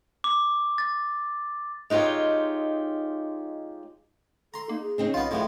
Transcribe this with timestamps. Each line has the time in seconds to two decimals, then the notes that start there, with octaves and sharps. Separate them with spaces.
0.24 D6
0.78 A6
1.90 G#3 D#4 F4 G4 C#5
4.54 A4 A#5 C6
4.69 A#3 D#4
4.81 G#4
4.98 C#3 C4 D#4
5.14 B1 B3 F4 D#5
5.31 D1 A2 E3 F3 G#3 F#4 G4